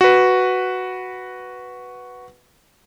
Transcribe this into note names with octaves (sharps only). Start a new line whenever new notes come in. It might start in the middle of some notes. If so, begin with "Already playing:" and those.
F#4 B4